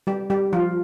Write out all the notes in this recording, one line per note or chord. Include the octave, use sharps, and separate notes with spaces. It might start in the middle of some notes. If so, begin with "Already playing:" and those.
G3 G4
G3 G4
F3 F4